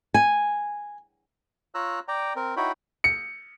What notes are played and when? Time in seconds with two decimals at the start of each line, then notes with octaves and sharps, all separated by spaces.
0.14 G#5
1.75 F4 C#5 A#5 E6 F#6
2.08 D5 G5 A#5
2.36 C4 A#4
2.57 D#4 E4 F#4 C#5 G5 B5
3.04 C#7